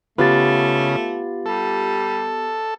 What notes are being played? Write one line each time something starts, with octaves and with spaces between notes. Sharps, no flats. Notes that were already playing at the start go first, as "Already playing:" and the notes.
C#3 A3 B3 F4 G4 B4 A6
G3 A4